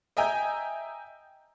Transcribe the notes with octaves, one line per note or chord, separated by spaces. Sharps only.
D#5 E5 G5 G#5 A#5 G6